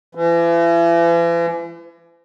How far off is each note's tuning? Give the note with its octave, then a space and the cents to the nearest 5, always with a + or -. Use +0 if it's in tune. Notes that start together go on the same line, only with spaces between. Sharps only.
E3 +40